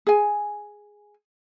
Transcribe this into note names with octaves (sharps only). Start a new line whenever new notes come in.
G#4 G#5